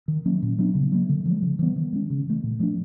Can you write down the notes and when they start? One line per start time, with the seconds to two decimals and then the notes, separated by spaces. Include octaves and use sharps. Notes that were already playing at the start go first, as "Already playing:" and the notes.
0.08 D#3
0.26 F#3 A#3 C#4
0.42 A#2
0.59 F#3 B3 D4
0.75 C#3
0.92 F#3 A#3
1.09 D3
1.25 F3 G#3
1.42 C#3
1.59 E3 G3 B3
1.76 D#3
1.93 G#3 C#4
2.10 C#3
2.27 E3 A3
2.44 A#2
2.60 F3 A3 D4